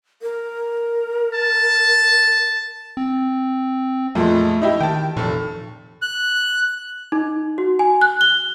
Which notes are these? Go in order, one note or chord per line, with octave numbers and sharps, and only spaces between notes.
A#4
A5
C4
F2 A#2 G#3 A3
D#4 E4 G4
D#3 G5 A5
F1 A#2 A4
F#6
D#4
F#4
G#5
F#6
G7